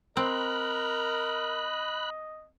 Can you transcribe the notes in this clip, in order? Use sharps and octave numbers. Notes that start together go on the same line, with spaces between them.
C4 A#4 D#5 B5 F#6